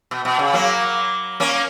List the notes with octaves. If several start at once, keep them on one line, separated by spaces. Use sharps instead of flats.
B2
B2
C#3
F#3 A#3
A#3 C#4